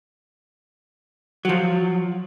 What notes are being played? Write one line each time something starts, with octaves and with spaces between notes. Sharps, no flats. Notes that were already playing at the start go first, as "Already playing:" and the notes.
F3 F#3